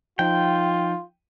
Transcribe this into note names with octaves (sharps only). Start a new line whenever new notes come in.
F3 D#4 F4 G5